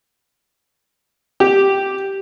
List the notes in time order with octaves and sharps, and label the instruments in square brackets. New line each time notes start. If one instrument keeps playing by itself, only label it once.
[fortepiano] G4